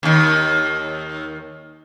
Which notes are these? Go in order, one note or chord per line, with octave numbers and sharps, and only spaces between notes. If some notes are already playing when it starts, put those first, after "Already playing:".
D#2 D#3